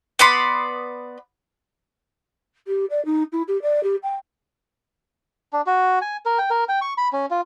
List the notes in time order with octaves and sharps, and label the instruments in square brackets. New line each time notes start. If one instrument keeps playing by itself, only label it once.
[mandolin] B3 D5 B5 C6
[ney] G4
D5
D#4
E4
G4
D5
G4
G5
[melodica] D4
F#4
G#5
A#4
G5
A#4
G5
C#6
B5
C#4
F4